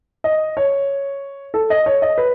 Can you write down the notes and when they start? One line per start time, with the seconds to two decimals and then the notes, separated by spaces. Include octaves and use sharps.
0.24 D#5
0.57 C#5
1.54 A4
1.70 D#5
1.86 C#5
2.02 D#5
2.18 B4